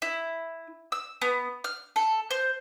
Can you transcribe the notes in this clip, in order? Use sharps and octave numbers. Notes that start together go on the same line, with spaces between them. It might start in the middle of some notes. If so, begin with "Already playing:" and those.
E4
E6
B3
F6
A4
C5